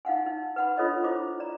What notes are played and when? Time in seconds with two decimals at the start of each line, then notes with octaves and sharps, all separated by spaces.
0.05 D#4 F5 F#5 G#5
0.26 D#4
0.56 B4 F#5 B5
0.77 D4 F4 A4 C#5 D#5 B5
1.04 E4 F4 C5 B5 D6
1.40 D5 A#5